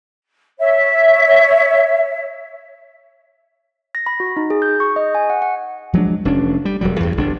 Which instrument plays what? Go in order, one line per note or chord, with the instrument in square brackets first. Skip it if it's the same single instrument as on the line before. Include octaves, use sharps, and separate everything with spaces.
[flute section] C#5 E5
[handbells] A#6
B5
F#4
D#4
G#4
G6
C#6
D#5
G#5
F#5
F#5
[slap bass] F3 F#3 G#3 D4
F1 C#4 D4
G3
E1 F#3 G3
E2 G2
G1 D4